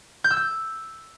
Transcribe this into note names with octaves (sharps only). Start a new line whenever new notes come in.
G6
E6
G6